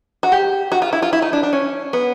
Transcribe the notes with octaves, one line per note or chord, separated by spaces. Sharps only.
F#4
G4
F#4
F4
E4
F4
E4
D#4
D4
D4
C#4
B3